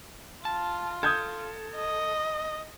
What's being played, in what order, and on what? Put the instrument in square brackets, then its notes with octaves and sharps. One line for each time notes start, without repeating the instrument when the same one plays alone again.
[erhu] F4 [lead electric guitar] A5
[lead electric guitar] A4 [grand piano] D#6 G6 G#6
[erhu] D#5